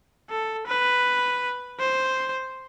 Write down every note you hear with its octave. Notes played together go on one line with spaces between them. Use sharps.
A4
B4
C5